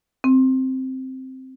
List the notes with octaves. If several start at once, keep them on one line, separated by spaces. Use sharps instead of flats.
C4